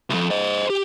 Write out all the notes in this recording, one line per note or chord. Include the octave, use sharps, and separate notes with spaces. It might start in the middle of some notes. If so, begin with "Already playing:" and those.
C2 F2
C5 D#5
G4